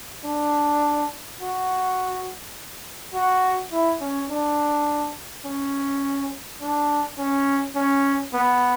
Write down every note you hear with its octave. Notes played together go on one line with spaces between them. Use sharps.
D4
F#4
F#4
E4
C#4
D4
C#4
D4
C#4
C#4
B3